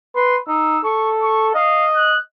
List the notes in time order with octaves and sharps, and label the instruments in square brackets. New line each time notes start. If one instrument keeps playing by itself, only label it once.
[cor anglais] B4 [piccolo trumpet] C6
[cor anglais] D#4 [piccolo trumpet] E6
[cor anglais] A4 [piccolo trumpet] C#6
[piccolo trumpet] C#6
[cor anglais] D#5 [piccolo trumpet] F5
[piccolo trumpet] F#6